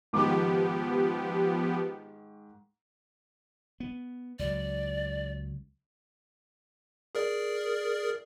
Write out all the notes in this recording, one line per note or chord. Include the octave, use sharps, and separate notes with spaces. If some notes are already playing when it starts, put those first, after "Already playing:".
G#2 D#3 F3 B3 G4 D6
B3
C#2 F#3 D5
G#4 A#4 D5